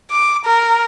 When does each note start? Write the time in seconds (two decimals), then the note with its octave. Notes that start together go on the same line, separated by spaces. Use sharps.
0.11 D6
0.45 A#4